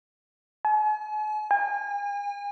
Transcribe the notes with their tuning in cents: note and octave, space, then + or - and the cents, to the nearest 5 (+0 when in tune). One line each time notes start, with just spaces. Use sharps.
G#5 +45
G#5 -40